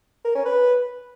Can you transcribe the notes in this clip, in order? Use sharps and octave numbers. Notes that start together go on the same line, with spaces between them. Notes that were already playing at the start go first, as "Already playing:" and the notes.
A#4
C#4
B4